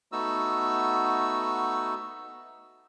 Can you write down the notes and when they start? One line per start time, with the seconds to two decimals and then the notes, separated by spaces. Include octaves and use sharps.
0.12 A3 B3 D#4 F#4 E6